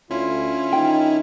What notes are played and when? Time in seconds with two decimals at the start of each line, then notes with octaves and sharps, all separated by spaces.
0.11 D2 C#4 E4 F4
0.73 G2 D#3 D#4 G5